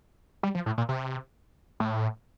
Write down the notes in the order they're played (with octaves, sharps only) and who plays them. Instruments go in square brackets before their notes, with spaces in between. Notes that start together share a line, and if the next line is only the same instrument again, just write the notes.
[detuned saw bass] G3
F3
A2
A#2
C3
A2